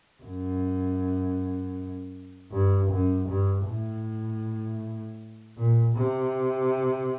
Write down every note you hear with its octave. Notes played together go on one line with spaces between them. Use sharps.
F#2
G2
F#2
G2
A2
A#2
C3